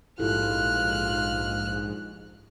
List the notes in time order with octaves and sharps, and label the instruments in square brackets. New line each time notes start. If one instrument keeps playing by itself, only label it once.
[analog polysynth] A#1 G#2 [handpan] E4 G4 A4 [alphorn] F4 [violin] F6 F#6